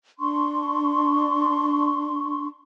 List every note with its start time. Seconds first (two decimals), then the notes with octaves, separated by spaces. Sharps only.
0.19 D4 C6 C#6